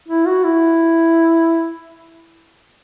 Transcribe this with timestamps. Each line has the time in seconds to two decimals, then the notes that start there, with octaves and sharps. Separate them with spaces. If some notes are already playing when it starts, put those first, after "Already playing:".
0.08 E4
0.26 F#4
0.44 E4